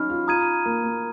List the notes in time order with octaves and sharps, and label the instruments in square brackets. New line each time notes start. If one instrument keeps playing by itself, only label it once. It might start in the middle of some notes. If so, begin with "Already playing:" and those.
Already playing: [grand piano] F#3 C#4 D#4 [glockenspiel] B5 F6
[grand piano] F4
[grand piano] F4 [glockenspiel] A#5 D#6 G#6 D#7
[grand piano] A#3
A#3